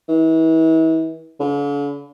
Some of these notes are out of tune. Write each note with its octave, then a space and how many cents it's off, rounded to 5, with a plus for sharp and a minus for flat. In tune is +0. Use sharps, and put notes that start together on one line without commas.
E3 -35
D3 -45